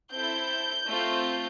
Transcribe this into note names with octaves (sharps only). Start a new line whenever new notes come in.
C4 E4 A4 G6
A3 C4 F4